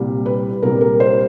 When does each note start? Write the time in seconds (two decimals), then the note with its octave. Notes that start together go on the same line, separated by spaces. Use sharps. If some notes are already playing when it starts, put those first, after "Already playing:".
Already playing: C2 A#2 G3
0.26 B4
0.63 C2 A#2 G3 A#4
0.81 A#4
1.00 C5